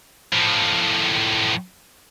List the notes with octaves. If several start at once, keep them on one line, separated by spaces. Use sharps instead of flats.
A2 F3